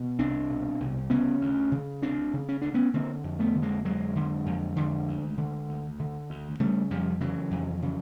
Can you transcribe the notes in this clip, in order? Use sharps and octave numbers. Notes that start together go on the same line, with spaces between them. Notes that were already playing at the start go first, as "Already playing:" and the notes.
Already playing: B2
C2 C4 D4
B2
C2
C#3 B3 C#4
D2
C#3
D2 C4 D4
C#3
C#4
D2 D4
B3 C#4
D3 A#3 C4
F2
A3 B3
D3
G#3 A#3
F2 F#3 G#3
D3
F2
D3
D2
D3
D2
D3
D2
C#3 G3 A3
F2 F3 G3
C#3 E3 F#3
F2
C#3